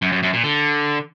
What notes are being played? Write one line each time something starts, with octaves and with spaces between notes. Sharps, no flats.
F#2
F#2
F#2
A#2
D3